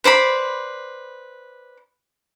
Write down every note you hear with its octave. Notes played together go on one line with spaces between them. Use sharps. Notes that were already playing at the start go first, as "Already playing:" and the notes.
B4 C5 D5 B5